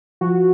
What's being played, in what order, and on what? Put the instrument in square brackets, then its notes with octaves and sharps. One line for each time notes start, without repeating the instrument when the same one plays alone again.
[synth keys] F3 F#4